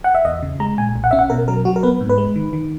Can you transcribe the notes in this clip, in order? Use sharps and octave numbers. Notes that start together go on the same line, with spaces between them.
F#5
E5
E2 D#5
C#3
G#3 A#5
A#2 G#5
B1
F#5
C#4 E5
F#5
B2 A#4
F#3 A#4
F#3 F#4
A#4
B3 B4
G#2
B4
G#3
D#3
D#3